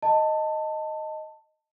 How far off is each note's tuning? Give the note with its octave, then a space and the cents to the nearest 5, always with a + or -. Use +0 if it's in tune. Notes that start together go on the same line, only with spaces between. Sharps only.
D#5 +0 A5 +15